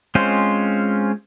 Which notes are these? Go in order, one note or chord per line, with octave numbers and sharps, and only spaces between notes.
G#3 C4 C#4 F4 C5